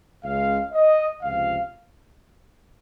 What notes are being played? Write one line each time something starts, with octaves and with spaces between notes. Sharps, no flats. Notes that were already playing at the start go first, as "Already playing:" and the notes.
C#2 C#3 G#3 F5
D#5
C#2 C3 F3 F5